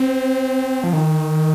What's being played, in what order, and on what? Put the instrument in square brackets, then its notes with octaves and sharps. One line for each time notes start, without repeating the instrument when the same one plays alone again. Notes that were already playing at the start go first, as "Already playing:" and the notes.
Already playing: [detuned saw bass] C4
F3
D#3